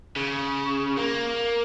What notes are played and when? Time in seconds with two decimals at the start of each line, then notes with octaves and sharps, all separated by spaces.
0.16 C#3
0.97 A#3